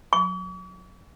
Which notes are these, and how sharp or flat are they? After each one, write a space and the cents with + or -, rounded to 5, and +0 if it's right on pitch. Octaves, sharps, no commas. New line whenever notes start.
C#6 +45